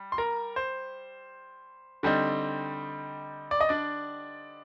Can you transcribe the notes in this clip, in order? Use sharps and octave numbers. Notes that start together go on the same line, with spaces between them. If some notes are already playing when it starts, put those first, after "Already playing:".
Already playing: G3
C6
A#4 A#5
C5
D3 G3 C4 D#4
D5
D#5
D4 D5